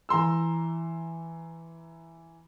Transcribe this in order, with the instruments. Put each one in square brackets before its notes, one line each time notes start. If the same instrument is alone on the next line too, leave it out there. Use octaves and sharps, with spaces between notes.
[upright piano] E3 A#5 C6 E6